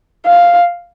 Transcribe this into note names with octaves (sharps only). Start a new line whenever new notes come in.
F5